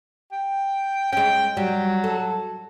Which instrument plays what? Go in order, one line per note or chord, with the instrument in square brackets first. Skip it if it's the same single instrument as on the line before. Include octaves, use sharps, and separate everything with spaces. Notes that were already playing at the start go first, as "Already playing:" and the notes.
[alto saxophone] G5
[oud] G#3 C#4 [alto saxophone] G5
[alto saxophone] F#3 [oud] G3
[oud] A4